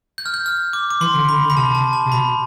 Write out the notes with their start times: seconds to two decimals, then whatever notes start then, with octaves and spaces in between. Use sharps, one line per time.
0.18 G6
0.26 F6
0.34 G6
0.46 F6
0.73 D6
0.91 D6
1.00 E3 C6
1.15 D3
1.28 D3 B5
1.42 D3
1.50 B5
1.56 C3 A5
1.75 A5
1.93 A5
2.05 C3
2.11 B2 B5